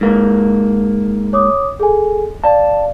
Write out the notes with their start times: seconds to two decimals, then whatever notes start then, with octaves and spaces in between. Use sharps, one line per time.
0.01 G#2 A#3
1.33 C#5 D6 D#6
1.80 G#4 A4 G#5
2.44 D5 F5 A5